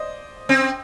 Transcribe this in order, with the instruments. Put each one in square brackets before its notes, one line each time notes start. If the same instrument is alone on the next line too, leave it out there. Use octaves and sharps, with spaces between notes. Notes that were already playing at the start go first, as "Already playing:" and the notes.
Already playing: [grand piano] C5 D5 D#5
[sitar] C4